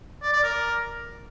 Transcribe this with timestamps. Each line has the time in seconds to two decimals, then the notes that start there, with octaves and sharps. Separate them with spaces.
0.23 D5
0.33 D5
0.43 A#4